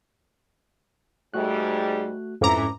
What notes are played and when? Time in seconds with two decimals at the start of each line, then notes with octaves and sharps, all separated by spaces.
1.34 G#2 G3 A3 F#4 F#6
2.41 F2 G#2 E3 A3 C#4 E4 A#5 D6